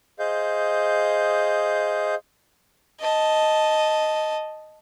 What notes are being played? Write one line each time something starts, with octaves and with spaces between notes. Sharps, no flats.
G#4 C5 D#5 F5 G6
D#5 A5